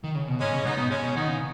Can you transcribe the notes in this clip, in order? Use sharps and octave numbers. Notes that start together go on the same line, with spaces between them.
D#3
C#3
B2
G#2 G#3 C#4
C#3
G#2 B3 D#4
B2
G#3 C#4
B2
D#3 B3 D#4
C#3